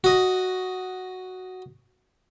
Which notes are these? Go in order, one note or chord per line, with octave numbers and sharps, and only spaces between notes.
F#4 D#5